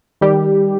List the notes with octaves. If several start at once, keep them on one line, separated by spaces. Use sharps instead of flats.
D#3 G3 G4